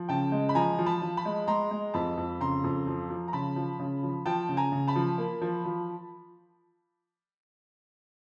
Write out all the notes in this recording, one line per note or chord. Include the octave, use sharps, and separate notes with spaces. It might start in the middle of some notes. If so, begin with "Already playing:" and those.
Already playing: F3
C#3 G5 A5
G#3
B5
F3 G#5 A#5
F3
A5 B5
F3
A5 B5
G#3
G#3 A#5 C6
G#3
F2 A5 B5
F2
C#3 A#5 C6
F2
F3
F3
A#5
C#3 A5 B5
F3
C#3
F3
F3 G5 A5
C#3
G#5 A#5
C#3
A5 B5
F3
A#3
F3
F3